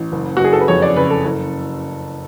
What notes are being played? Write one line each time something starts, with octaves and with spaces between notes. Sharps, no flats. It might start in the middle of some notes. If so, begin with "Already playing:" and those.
Already playing: A1
F#1
F#4
F#1 G#4
A4
B4
F2 C#5
D5
C#3 B4
A4
F#1